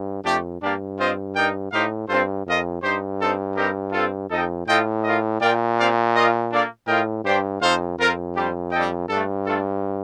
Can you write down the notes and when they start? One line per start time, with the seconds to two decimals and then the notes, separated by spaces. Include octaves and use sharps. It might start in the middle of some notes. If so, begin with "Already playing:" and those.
Already playing: G2
0.24 F2 A3 D4 G4
0.62 G2 A#3 D4 G4 D5 F5
0.98 C4 F4 C5 D#5
1.35 D#4 A#4 D5 G5
1.72 A2 D#4 G4 C5 F5
2.08 G2 C4 F4 A4 C5
2.45 F2 F4 A#4 D#5
2.82 G2 D#4 G4 C5
3.19 C4 D#4 A4 C5
3.56 G3 C4 D#4 G4 A#4
3.92 C4 F4 A4
4.29 F2 D#4 A4 D#5 G5
4.66 A2 F4 A4 D#5 G5
5.03 F4 A#4 D#5
5.40 A#2 F4 A#4 D5 G5
5.77 C4 G4 D5 F5
6.14 F4 A#4 D#5
6.50 A#3 D4 A4 D5 F5
6.87 A2 F4 A#4 D#5 G5
7.24 G2 D4 G4 C5 G5
7.61 F2 D#4 A4 C5 F5
7.98 F2 C4 F4 A#4 F5
8.34 G3 D4 G4 C5
8.72 G3 D4 A4 D#5 G5
9.08 G2 A3 D4 A4
9.45 A3 D4 F4 A4